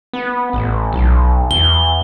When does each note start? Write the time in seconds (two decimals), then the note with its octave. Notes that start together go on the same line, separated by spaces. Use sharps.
0.13 B3
0.53 A1
0.93 B1
1.51 E2 G7